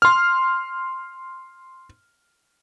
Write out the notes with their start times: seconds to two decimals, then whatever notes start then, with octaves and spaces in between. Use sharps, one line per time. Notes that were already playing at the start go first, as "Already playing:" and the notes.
0.02 C6 F6